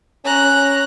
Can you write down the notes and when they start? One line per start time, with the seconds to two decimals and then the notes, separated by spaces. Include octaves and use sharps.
0.25 C#4 A#5 F#6